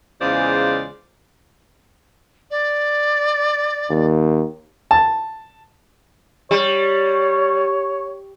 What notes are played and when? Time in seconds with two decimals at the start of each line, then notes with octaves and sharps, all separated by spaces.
0.21 E2 C#3 G#3 F4 C5 D5
2.51 D5
3.90 D#2
4.91 A5
6.51 G3 C#5